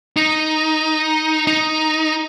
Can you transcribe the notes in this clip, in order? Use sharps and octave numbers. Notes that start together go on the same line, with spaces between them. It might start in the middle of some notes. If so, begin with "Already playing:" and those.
D#4
D#4